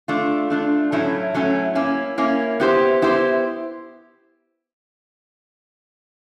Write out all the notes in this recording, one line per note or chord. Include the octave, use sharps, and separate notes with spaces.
A3 D4 F4
A3 D4 F4
A2 F#3 A3 C#4 E4
A2 F#3 A3 C#4 E4
A#3 C#4 E4
A#3 C#4 E4
B3 E4 G4 C5
B3 E4 G4 C5